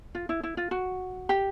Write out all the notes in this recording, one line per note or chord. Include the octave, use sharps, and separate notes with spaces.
F4
E4
E4
F4
F#4
G4